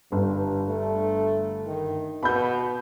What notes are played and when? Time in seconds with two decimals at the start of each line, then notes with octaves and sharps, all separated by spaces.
0.12 G1 G2
0.67 A3
1.66 D#3
2.23 B2 B5 G6